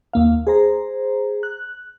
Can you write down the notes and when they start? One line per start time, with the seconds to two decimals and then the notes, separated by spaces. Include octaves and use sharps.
0.13 D#2 A#3 F5
0.47 G#4 C5 A#5
1.43 F#6